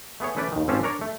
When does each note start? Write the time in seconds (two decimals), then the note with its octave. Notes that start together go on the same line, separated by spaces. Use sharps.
0.20 A3 B3 G#4 C#5
0.36 E3 A3 C#4 B4 D5
0.52 D#2 D#3
0.68 G#1 C4 C#4 F4 G4 A5
0.83 D4 A#4 C#5 D5
1.01 A3